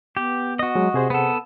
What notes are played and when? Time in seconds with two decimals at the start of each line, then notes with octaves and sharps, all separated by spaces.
0.17 B3 G4
0.59 F#4 D#5
0.75 F#3 G#3
0.94 C3 G#4 C5
1.10 B3 A4 F#5